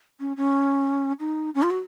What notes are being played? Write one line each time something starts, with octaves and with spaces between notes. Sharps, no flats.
C#4
C#4
D#4
C#4
F4
F#4